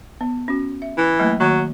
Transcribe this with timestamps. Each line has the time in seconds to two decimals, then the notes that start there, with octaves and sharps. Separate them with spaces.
0.21 B3
0.48 C#4 F#4
0.82 E5
0.98 E3
1.20 F#3 A3 A#3
1.40 D#3 F#3 A#3 F#4